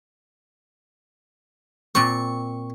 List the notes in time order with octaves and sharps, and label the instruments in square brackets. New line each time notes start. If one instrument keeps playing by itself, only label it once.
[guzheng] A#2 C4 C5 [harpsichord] C#6